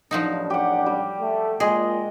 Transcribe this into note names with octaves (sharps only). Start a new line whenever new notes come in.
A1 C#3 F3 F#3 D4 D#4
G4 F#5
G3
A3
A#2 G#3 G#4 D#5